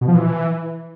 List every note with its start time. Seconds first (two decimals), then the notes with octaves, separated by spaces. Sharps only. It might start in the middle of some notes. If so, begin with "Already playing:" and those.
0.01 B2
0.08 F3
0.15 E3